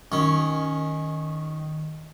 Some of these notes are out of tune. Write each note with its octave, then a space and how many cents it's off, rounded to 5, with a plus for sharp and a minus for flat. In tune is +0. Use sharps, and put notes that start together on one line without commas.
D#3 +0 C#4 +0